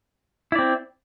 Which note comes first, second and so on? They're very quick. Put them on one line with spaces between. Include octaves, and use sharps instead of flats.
E4 D5 C4